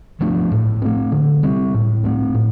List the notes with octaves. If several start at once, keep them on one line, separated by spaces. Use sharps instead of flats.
F3 A3 D4
A2
A3 C4
D3
G3 C4
A2
A3 C4
A2